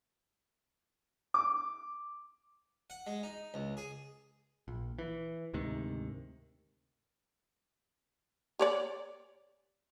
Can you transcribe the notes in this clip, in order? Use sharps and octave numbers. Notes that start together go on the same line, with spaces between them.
D6
F#5
G#3
D#4
C#2
G#4
A#1
E3
D2 G#2 C3 D#3
G4 C#5 D5